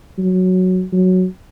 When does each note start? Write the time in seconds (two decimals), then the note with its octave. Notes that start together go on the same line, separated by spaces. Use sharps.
0.18 F#3
0.93 F#3